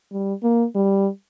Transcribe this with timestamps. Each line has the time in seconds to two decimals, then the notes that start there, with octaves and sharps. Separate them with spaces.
0.12 G3
0.43 A#3
0.75 G3